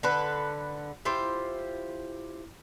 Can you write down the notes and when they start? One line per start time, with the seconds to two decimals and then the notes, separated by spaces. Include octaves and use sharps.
0.03 D3 A4 B4
1.05 E4 F4 G4 C5